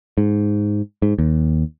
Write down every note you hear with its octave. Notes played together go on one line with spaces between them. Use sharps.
G#2
G#2
D#2